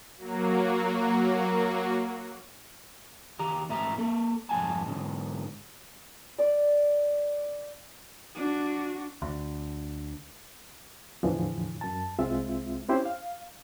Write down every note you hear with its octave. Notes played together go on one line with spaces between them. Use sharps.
F#3 A#3 F#4
D#3 G4 A#5
G#2 A3 A4 E5 A#5
A#3 A4
F2 G#2 C4 F#5 G#5 A5
G#2 D3
D5
D4 F#4
D2
E2 A2 D3 E3 F3
F#2 A5
C2 G#3 C4 F4 E5
C4 C#4 E4 G4 C5
F5